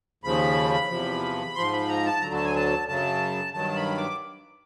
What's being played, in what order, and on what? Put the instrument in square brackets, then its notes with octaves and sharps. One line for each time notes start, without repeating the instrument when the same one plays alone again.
[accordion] D#2 C#3 F3 B5
E2 C3 F3
G#2 F3 C6
B5
A#5
A5
D2 D3 F#3 A#5
A5
G#5
A5
F#2 C#3 F#3 A5
G2 D#3 F#3 A5
B5
D6